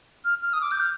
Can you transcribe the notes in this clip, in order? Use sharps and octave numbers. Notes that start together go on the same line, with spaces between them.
F6
F6
D#6
D6
G6
F6